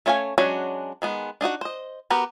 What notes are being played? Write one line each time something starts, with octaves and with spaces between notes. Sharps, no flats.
A3 C#4 C#5 F5 G#5
F#3 G#3 C#4 D4 F#4
D#3 G#3 B3
D4 D#4 F#4 F#5
C5 D#5
B3 F#4 G4 A#4